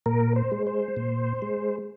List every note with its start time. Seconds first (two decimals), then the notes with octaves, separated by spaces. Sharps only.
0.06 A#2 A#4
0.36 C5
0.52 G#3
0.67 C5
0.97 A#2
1.42 G#3